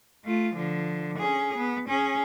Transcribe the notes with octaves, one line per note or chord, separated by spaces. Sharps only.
A3 F4
D3 F3
C#4 G#4
B3
C#4 G#4